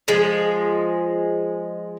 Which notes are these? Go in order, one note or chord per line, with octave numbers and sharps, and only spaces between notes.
F3 G#3